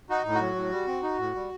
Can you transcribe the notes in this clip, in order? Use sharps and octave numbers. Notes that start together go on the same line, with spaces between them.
D#4 F#4
A2
F#4
F#3
A2
G3
C4
D#4
A2
G3